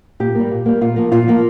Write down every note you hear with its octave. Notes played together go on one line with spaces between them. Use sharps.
A#2 G4
G3 A#3
A#2
G3 A#3
A#2 F4
F3 A#3
A#2 F4
F3 A#3